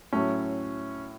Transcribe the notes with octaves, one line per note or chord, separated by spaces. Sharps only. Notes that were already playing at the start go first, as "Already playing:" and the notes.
A2 F#3 A3 C#4